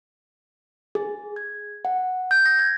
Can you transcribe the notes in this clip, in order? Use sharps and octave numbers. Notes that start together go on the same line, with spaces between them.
G#4
G#6
F#5
G6
A#6
G#6